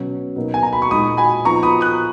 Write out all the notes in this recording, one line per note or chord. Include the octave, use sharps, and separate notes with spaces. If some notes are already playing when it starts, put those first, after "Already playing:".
Already playing: B2 F#3 C#4
B2 F#3 A#3 D#4
G#5
A#5
B5
C#6
A#2 G#3 D#4 B5 D#6
G#5 B5
F3 B3 D#4 A#5 C#6
B5 D#6
D#6 F#6